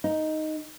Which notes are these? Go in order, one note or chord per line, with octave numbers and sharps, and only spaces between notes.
D#4